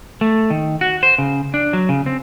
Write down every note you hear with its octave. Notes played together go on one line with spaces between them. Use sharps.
A3
D#3
F#4
C5
C#3
D4
F#3
C#3
C4